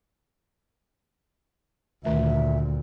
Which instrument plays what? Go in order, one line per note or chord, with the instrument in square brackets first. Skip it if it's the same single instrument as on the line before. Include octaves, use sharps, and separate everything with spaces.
[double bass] D2 A#2 [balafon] D#3 A3 [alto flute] E5